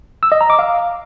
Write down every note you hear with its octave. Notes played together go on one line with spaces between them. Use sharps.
E6
D#5
A#5
D6
F5